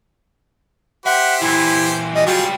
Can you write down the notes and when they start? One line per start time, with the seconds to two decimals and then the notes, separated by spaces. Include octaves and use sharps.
1.06 G4 C5 E5 F#5
1.41 A#2 E3 E4
2.15 G3 D#5
2.27 C#2 G3 F4 F#4 G#4